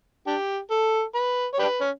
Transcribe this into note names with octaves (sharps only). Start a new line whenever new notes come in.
D4 G4
A4
B4
C#5
D4 G4 B4
C#4